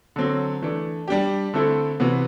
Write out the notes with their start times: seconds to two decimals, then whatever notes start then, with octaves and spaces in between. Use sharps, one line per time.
0.16 D3 F#3 C4
0.62 E3 A3 D4
1.08 G3 D4 G4
1.54 D3 A3 C4 E4 A4
2.00 C3 E3 B3 F#4